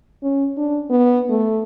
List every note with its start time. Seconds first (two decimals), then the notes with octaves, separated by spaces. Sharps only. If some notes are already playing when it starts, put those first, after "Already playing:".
0.23 C#4
0.57 D4
0.90 B3
1.30 A3